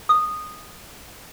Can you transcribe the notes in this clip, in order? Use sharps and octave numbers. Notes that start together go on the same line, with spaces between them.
D#6